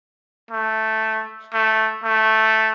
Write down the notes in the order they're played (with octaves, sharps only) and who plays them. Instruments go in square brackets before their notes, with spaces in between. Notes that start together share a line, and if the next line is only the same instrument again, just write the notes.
[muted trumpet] A3
A3
A3